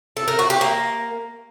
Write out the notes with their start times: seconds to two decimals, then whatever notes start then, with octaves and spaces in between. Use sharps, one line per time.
0.17 A4
0.28 A#4
0.39 F#4
0.50 G4
0.61 A#3